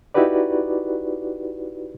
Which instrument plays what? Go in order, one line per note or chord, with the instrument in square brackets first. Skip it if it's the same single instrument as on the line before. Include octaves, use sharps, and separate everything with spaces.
[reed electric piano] D#4 E4 F#4 G4 B4 D5